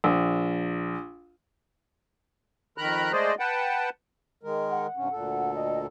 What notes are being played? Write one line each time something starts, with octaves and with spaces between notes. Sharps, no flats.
A#1
F2 D#3 A#4 A#5 B5 F#6
G#3 A3 G#4 C5 D5 D#5
B4 F#5 G5 A5
D#3 G#3 A#4
F#5
G2 C3 C#4
D2 A#2 A4
D#5